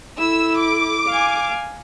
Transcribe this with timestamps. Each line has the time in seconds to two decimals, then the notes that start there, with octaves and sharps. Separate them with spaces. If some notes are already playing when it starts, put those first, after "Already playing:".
0.18 E4 A4 E6
0.58 D6
1.07 F5 G#5